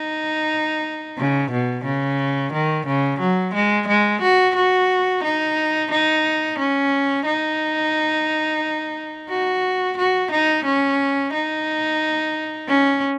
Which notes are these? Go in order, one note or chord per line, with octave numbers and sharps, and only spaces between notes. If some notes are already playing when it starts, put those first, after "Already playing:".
Already playing: D#4
C#3
B2
C#3
D#3
C#3
F#3
G#3
G#3
F#4
F#4
D#4
D#4
C#4
D#4
F#4
F#4
D#4
C#4
D#4
C#4